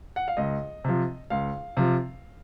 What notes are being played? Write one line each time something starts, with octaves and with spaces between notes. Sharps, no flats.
F#5
F5
C#2 D#5
C3 F3
C#2 F5
C3 F3